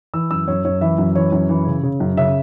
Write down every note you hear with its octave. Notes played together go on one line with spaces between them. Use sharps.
E3 E6
F#2 E6
F#2 C#5
F#2 C#5
E3 E5
F#2
E3 C#5
F#2
E3
C#3
C#3
F#2
C#3 E5